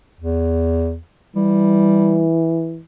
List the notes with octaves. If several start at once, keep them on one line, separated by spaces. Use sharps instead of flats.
E2
E3 G3